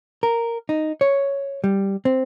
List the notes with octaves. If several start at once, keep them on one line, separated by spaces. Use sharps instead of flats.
A#4
D#4
C#5
G3
C4